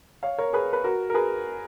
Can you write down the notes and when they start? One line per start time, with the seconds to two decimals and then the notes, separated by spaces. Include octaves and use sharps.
0.23 C#5 F5
0.38 A#4 C#5
0.53 G#4 B4
0.73 B4
0.84 F#4 A#4
1.10 A#4
1.14 G#4 B4